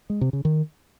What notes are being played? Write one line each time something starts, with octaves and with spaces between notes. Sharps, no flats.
G#3
C3
C#3
D#3